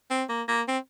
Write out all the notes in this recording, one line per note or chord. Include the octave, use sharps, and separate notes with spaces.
C4
A#3
A#3
C4